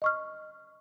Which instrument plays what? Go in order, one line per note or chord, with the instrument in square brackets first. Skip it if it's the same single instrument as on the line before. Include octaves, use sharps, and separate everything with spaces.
[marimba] D#5 C#6 F6